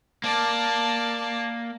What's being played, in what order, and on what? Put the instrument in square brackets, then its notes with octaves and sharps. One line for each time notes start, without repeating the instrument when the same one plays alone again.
[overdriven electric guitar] A#3 [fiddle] D5 A5